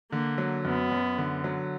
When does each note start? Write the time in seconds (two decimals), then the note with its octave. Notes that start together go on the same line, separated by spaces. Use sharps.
0.12 D3 A#3
0.38 F#3
0.65 F#2 B3
0.91 F#2
1.18 D3
1.44 F#3